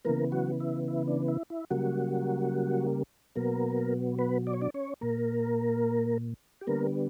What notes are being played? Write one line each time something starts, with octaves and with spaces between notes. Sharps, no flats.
C#3 E3 A#3 B3 A#4
F#3 F#4
E4
E4
D4
E4
E4
C#3 F#3 G3 A#3 F#4
B2 F#3 A#3 B3 A#4
B3 B4
D5
C#5
D4 D5
C#4 C#5
A#2 A#3 A#4
G4
D3 G3 A#3 B3 A#4